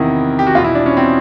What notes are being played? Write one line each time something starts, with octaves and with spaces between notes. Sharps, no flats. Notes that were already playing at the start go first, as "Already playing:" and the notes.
Already playing: E2 C3 D#3 E4
G4
F#4
E2 B2 F4
E4
D4
C#4
C4